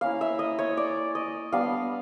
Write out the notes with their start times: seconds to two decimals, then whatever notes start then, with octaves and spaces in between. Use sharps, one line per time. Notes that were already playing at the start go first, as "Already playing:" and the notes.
0.01 A#3 C#4 E4 F5
0.21 E5
0.39 D#5
0.59 C#5
0.77 D5
1.15 D#5
1.52 G3 B3 D4 F5